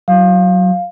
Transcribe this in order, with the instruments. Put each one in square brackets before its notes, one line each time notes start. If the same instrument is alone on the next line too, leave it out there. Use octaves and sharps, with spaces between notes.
[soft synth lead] F#3 [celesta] F5